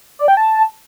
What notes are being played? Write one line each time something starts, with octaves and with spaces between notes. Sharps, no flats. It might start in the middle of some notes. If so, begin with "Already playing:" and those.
D5
G5
A5